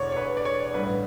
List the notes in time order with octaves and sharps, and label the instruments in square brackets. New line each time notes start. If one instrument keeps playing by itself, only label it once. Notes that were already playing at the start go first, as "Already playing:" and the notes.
Already playing: [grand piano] E1 E2 D3 C#5 D5
C#5
B4
D5
C#5
A1 G2 D3 B4